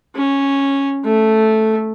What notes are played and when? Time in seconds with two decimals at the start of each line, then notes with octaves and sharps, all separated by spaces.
0.15 C#4
1.04 A3